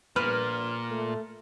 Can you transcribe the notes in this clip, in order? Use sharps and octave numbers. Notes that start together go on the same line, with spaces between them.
A#1 A#2 B4 F6
A3